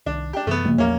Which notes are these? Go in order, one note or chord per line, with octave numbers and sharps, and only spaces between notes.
C2 D#3 D4
D4 G4
F#2 C3 E3 A3 B3
A#1 G2 C#3
E2 F#3 A3 A#3 C#4